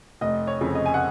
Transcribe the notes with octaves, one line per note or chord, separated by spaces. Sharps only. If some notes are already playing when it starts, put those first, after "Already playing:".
F1 D#5
C#5
F2 C#3
D#5
G#5
F#5